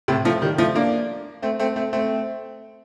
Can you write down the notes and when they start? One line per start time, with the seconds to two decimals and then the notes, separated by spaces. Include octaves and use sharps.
0.08 A2 C3
0.25 F3 A3
0.41 D#3 G3
0.58 F3 A3
0.75 A#3 D4
1.42 A3 C4
1.59 A3 C4
1.76 A3 C4
1.93 A3 C4